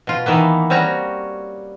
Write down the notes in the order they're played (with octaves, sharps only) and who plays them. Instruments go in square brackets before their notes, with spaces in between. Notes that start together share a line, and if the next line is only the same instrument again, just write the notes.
[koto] B2 F4
D#3 E3 A#3 B3
G3 C4 C#4 F#4 A#5